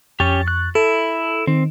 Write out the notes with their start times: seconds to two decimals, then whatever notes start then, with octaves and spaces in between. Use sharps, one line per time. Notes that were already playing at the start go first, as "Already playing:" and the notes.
0.20 F2 C#4 G4 C#6 A6
0.48 F#6
0.75 E4 A4
1.47 D#3 C4